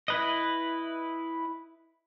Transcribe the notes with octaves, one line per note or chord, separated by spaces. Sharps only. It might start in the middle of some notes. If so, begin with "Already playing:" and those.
E4 B4 D#5